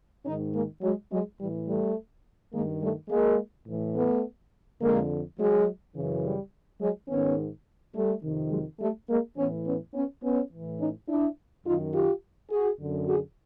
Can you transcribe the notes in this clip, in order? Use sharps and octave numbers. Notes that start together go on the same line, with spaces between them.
G#2 D#3 C#4 D#4
G#3 A#3
F#3 G#3
F#3 G#3
A2 E3 G3
G3 A3
G2 D#3 G#3 A#3
G3 A3
G#3 A#3
A2 E3
A3 B3
F2 D3 G#3 A#3
F#3 G#3
F#2 C#3 E3
G3
F#3 G#3
G#2 D#3 B3 C#4
G3 A3
F2 C3 D#3
F#3 G#3
G3 A3
G#3 A#3
A2 E3 B3 C#4
B3 C#4
B3 C#4
B3 C#4
A2 E3
C#4 D#4
D4 E4
F#2 D#3 D#4 F4
F4 G4
F#4 G#4
F#2 D3
F#4 G#4